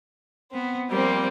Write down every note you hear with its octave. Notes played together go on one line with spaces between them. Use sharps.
B3 C4
F3 G3 A#3 C4